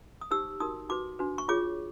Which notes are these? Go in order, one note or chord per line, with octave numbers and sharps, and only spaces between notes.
D#6
D#4 G4 C5 E6
D#4 F#4 A#4 D#6
D#4 F#4 B4 D6
D4 F#4 B4
C#6
F4 G#4 C#5 D6